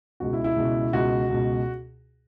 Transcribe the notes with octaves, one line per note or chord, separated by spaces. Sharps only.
C#2 B2 F#4
E4
E4
C#2 B2
C#2 B2 F#4
C#2 B2